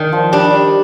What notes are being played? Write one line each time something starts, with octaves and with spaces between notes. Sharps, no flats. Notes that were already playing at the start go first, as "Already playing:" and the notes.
Already playing: D#3 D4
F3
G3 D4